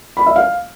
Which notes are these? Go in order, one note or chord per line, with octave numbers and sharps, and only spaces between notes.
B5
E5
F5